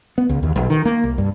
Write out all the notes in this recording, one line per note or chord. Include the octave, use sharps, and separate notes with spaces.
B3
C#2
D#2
B1
D#3
A#3
C2
G2